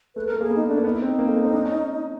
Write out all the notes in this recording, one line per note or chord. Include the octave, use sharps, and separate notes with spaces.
A3 B4
A#4
A3
A#3 G#4
B3
D#4
A3 D4
A#3
B3 D#4
E4
C4 D#4
A#3
A3
A#3
C4
D4
C#4